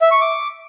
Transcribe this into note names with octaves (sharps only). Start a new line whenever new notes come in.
E5
C#6
D6